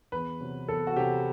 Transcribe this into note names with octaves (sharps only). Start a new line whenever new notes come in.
E2 B4
C3 F#3
E2 A4
F#4
C3 F#3 G4